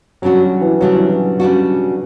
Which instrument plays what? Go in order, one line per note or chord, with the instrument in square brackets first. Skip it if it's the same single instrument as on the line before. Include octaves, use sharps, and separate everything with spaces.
[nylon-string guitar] C#3 G3 D4 F#4 [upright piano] F#3
[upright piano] F#3
E3
[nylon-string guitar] C#3 G3 D4 F#4 [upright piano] F#3
[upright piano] E3
F#3
[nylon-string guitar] C#3 G3 D4 F#4